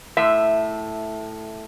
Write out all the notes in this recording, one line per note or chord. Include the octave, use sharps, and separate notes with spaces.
A2 E5